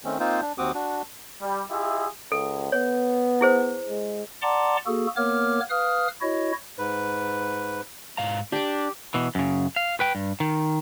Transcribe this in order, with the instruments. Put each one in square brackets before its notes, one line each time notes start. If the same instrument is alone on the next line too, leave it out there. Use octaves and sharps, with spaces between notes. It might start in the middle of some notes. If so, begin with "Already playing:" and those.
[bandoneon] D#3 A3 C4 C#4
A#3 C4 D#4 F4 C5
D4
D#2 C4 F#4 D6 D#6
D4 F#4
[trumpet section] G3
E4 F4 G4 G#4 D#5 E5
[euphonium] C#2 [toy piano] A4
[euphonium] B3 [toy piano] C#5
[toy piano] E4 G#4 C5
[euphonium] G#3
[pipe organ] D5 F#5 A5 A#5 C6 D6
A#3 F#4 G#4 A4
A#3 B3 A#4 C#5 D6 F6
B4 F5 D#6 F6
E4 F#4 C#5 D#5
[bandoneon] G#2 B4
[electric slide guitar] G#2 F5 A#5
[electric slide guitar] D4 [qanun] G4 D6
[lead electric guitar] B2 E3
F#2 C#3
F5
B4 G5
G2
D#3